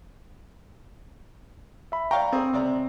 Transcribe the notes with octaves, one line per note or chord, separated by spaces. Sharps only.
E5 B5
D5 F5 G5 A#5 C#6
C4 G#4
C3 D5 A#5